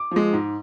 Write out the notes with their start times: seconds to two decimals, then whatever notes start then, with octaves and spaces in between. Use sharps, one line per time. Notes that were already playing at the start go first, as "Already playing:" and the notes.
Already playing: D6
0.11 F3 G#3
0.33 G#2